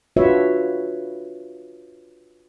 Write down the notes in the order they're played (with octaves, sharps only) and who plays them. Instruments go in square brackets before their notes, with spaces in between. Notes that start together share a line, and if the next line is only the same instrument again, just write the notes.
[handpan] D4 F4 F#4 B4 C#5 E5